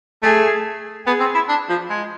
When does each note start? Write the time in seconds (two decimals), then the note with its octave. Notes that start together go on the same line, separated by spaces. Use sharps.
0.23 A3 G#4
1.07 B3 G#4
1.20 C4
1.35 E4
1.49 D4
1.69 F3
1.90 G#3